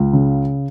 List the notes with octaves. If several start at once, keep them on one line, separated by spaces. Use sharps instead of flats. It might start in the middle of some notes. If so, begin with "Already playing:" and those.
Already playing: C#2
C#3